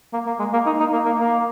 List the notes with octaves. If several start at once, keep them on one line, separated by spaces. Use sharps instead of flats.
A#3
A#3
G#3
A#3
D#4
D#4
A#3
A#3
A#3